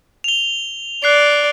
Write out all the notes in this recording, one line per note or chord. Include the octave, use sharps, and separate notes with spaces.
F7 G7
D5 F#6 C7